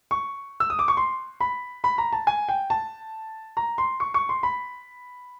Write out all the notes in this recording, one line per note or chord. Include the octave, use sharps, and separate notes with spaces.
C#6
E6
D#6
D6
C#6
C6
B5
B5
A#5
A5
G#5
G5
A5
A#5
C6
C#6
C#6
C6
B5